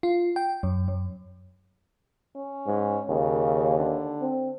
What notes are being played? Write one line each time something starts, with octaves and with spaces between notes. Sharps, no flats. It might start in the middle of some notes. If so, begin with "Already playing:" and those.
F4
G5
F#2
F#2
C#4
G#2
D#2 C#3
D3
C4